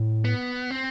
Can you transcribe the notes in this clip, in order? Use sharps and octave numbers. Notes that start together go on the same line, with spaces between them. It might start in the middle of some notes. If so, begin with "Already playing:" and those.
Already playing: A2
B3
C4